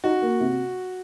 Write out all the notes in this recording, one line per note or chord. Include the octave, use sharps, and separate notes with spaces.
D#4 F#4
A#3
C3